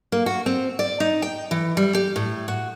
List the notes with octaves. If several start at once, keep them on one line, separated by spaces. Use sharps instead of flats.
A#3
F#4
C4
D5
D#4
G5
E3
G3
G4
A2
F#4